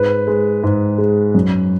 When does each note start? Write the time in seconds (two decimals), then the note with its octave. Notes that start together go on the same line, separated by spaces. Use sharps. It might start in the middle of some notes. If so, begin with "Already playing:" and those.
Already playing: G#2 B4
0.27 G#3
0.63 G#2
0.98 G#3
1.35 F#2